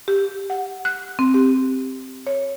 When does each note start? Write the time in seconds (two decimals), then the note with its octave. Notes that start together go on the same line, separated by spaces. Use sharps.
0.08 G4
0.50 F#5
0.85 F#6
1.19 C4
1.34 G4
2.27 C#5